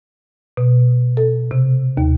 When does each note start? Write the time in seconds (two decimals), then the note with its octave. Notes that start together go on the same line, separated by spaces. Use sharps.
0.57 B2
1.17 A4
1.51 C3
1.97 D#2